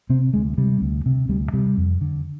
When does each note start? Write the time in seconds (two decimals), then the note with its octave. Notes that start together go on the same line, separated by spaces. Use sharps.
0.10 C3 C4
0.34 D2 G#3
0.58 C3 G3
0.81 D2
1.06 C3
1.29 D2 G3
1.53 C3 G3
1.77 F2
2.01 D3